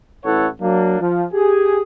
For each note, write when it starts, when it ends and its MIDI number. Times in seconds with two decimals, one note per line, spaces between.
0.24 0.48 33
0.24 0.48 64
0.24 0.48 69
0.24 0.48 71
0.24 0.48 73
0.24 0.48 78
0.61 1.00 54
0.61 1.00 58
0.61 1.00 62
1.01 1.24 53
1.33 1.81 67
1.33 1.81 68